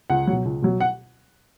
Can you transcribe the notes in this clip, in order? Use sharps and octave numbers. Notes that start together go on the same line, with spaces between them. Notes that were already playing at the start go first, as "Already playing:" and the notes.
C#2 F#5
B2 F#3
C#2
B2 F#3
F#5